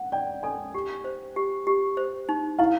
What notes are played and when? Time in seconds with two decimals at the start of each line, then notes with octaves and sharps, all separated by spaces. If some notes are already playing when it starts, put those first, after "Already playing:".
Already playing: F#5
0.12 D5 G5
0.43 A4 G#5
0.74 G4
1.05 C5
1.36 G4
1.67 G4
1.97 C5
2.29 D#4
2.59 E4 F5